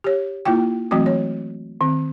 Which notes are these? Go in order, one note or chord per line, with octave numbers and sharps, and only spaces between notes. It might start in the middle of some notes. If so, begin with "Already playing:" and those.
G4 C#5
A#3 E4 F4 G5
E3 F#3 A3 C4 F#4
C#5
D#3 C4